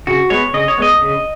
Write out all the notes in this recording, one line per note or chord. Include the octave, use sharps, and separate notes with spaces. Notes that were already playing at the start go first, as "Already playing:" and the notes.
C#3 F#4
G#3 B3 C#5
C#3 D#5
C#5
G#3 B3 D#5
C#3